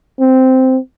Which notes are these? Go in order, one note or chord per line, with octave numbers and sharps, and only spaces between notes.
C4